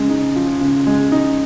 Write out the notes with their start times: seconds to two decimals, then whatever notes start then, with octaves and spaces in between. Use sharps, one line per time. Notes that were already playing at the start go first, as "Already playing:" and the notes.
Already playing: C#3 G#3
0.09 D#4
0.36 F3
0.61 C#3
0.87 G#3
1.12 D#4